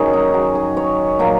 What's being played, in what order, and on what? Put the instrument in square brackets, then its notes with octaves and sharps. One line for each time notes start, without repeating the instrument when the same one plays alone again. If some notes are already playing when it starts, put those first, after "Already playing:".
Already playing: [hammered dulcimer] G#2 D#3 F#3 C#4 G#4 A#4 C#5
D#4
F#4
G#4
C#5
A#2 F#3 A#3